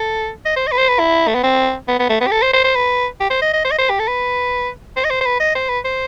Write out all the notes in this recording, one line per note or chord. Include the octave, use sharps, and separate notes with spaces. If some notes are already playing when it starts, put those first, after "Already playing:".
Already playing: A4
D#5
C5
D#5
B4
C5
B4
E4
A3
B3
C4
B3
B3
A3
B3
G4
A4
C5
C5
C5
B4
G4
C5
D#5
D#5
C5
D#5
C5
G4
A4
B4
C5
D#5
C5
C5
B4
D#5
C5
B4
C5